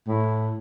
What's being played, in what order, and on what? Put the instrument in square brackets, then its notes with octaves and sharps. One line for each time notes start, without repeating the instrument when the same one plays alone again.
[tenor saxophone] A2